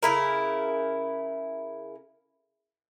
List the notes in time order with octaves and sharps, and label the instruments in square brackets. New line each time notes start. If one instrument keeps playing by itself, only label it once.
[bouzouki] C#3 E4 A#4